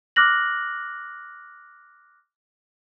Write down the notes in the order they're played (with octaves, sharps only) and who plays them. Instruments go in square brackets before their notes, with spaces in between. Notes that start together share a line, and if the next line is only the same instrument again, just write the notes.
[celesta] D6 F6 F#6 A#6 F#7